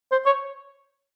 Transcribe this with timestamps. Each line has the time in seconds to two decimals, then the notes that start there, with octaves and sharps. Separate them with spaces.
0.12 C5
0.26 C#5